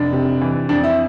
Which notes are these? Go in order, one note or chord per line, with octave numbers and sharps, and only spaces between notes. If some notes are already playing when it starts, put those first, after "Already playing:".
Already playing: F1 D4
C3
E3
F2 D4
E4